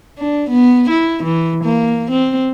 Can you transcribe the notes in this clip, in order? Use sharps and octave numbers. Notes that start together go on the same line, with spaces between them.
D4
B3
E4
E3
A#3
C4